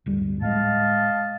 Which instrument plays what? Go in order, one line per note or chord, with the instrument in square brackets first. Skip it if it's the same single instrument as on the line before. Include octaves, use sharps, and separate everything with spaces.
[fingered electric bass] D1 G1 G3
[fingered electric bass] A2 G#3 [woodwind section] D#5 F5 A5